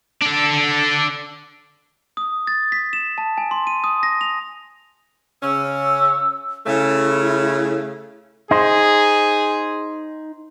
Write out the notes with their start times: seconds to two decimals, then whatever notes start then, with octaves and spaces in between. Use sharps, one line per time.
0.22 D4 A4
2.17 D#6
2.47 A6
2.72 B6
2.93 E7
3.18 A5
3.38 G#5
3.51 C6
3.67 D#7
3.84 D#6
4.03 A#6
4.21 F7
5.43 C#3 C#4 E6
6.66 C#3 A3 E4
8.51 D#4 G#4 C5